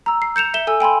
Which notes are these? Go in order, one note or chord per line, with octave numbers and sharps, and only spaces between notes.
A#5 E6
C7
G6 C#7 E7 F7
E5 E7 G7
A4 G#5 E6
G5 G#5 B5 C6